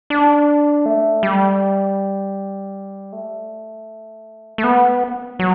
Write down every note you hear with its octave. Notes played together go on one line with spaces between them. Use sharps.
D4
A3
G3
A3
A3
B3
F#3